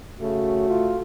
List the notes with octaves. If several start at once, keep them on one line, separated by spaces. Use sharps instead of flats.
C#3 A3 F#4
F4